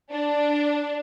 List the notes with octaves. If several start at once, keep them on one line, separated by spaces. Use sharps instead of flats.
D4